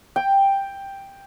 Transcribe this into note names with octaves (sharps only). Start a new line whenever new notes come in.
G5